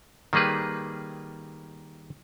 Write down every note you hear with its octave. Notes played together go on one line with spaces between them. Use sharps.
D#3 G3 A#3 G#4 B4